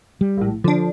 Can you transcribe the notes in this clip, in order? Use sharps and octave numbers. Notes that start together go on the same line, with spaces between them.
G3
A#1 A2
D3 F3 D4